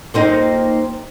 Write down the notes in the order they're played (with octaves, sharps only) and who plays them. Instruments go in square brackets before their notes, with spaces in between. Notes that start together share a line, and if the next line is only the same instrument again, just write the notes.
[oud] A#3 C4 D#4